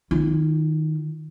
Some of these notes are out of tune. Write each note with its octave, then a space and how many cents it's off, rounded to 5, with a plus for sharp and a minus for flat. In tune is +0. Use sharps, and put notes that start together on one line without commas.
D#3 +0 F4 -40